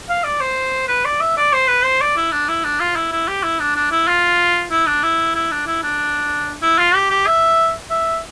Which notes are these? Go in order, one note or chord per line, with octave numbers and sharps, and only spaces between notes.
F5
D5
C5
B4
D5
E5
D5
C5
B4
C5
D5
E4
D4
E4
D4
F4
E4
E4
G4
E4
D4
D4
E4
F4
E4
D4
E4
E4
D4
E4
D4
E4
F4
G4
G4
E5
E5